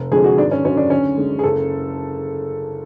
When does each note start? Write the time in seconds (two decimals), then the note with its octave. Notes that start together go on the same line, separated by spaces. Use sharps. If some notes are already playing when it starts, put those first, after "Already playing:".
Already playing: F1
0.11 F2 D3 G#3 G#4
0.24 F#4
0.37 G#1 D4
0.51 C#4
0.65 F#2 D3 F#3 C#4
0.77 D4
0.90 D2 C#4
1.17 D3 G#3
1.39 G#4
1.43 F#1 A4